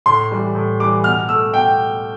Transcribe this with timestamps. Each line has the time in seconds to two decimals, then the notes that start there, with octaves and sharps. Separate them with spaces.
0.06 A2 C6
0.31 E3 G3
0.55 A2
0.80 E3 G3 D6
1.04 B2 F6
1.29 A3 E6
1.54 B2 G5